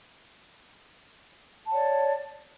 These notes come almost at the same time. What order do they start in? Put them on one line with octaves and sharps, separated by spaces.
A5 F#5 C#5 D5